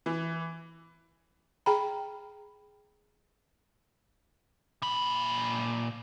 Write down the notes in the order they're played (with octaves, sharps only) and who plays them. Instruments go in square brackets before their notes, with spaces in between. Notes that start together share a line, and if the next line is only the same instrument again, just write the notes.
[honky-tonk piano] E3
[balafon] G#4 G5 A#5 B5
[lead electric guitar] A#2 B5